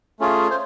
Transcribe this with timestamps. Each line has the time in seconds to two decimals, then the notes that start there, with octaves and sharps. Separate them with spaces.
0.19 A3 C#4 F4 G#4
0.51 C5